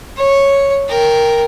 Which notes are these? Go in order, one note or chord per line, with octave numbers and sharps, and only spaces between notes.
C#5
A#4 G5